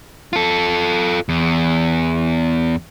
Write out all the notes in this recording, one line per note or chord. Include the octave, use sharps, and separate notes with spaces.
F4 A4
E2